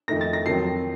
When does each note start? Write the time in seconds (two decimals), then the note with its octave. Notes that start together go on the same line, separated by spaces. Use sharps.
0.08 F2 D#3 A3 D#4 A#6
0.21 A6
0.33 A#6
0.46 F2 D#3 F#3 C4 C7